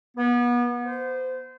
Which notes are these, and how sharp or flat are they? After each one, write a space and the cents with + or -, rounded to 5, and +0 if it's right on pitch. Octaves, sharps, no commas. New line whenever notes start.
B3 -30
C5 -25